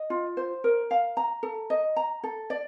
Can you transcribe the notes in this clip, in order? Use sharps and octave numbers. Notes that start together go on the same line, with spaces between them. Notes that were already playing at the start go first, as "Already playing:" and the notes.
Already playing: D#5
F4
C5
A#4
F5
A#5
A4
D#5
A#5
A4
D5